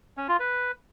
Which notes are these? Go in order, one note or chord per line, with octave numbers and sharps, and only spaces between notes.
C#4
F4
B4